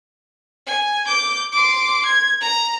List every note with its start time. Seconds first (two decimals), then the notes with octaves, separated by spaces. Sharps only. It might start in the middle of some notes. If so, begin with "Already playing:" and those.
0.67 G#5
1.06 D6 G6
1.53 C6 D6
2.06 G#6
2.41 A#5